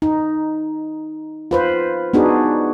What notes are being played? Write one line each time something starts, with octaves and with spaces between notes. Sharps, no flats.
D#4
F4 B4 C5
B3 D4 D#4 F#4 G#4